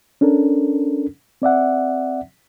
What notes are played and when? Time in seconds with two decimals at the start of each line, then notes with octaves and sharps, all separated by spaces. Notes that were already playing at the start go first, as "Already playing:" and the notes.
0.21 C#4 D4 A4 A#4
1.42 C4 D5 E5 F#5